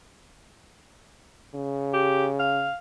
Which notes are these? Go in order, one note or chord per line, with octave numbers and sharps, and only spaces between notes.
C#3
G4
F5